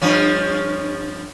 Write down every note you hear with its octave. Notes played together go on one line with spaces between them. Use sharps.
G2 F3 C#4